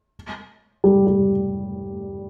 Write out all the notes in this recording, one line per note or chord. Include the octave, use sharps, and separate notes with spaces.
G3
G3